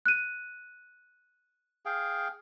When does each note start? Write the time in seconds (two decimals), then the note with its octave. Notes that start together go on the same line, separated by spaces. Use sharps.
0.06 F#6 D#7
1.85 G#4 F5 G5